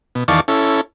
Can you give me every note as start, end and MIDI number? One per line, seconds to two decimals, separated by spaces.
0.15 0.24 47
0.28 0.40 40
0.28 0.40 51
0.28 0.40 74
0.28 0.40 77
0.28 0.40 81
0.28 0.40 85
0.48 0.81 61
0.48 0.81 64
0.48 0.81 69